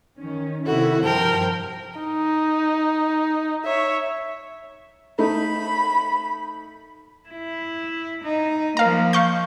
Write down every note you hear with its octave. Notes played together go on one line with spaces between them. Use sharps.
D#3 C#4
C3 D#3 E4 F#4 A4
G2 F3 A#4 C5 G5 A5
D#4
C#5 E5
A3 D#4 B5
E4
D#4
F3 A#3 A#4 F5 A#5
F5 C#6 G6